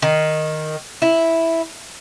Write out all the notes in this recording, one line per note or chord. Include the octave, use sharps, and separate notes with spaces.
D#3
E4